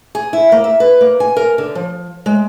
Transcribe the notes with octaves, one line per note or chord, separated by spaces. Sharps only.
G#4
E4
A#3
E5
B4
A#3
G#5
A#4
D3
F3
G#3